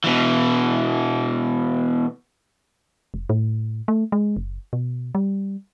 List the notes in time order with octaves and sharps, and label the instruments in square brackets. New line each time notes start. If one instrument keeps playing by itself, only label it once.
[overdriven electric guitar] B2 E3
[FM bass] F1
A2
A3
G#3
F#1
B2
G3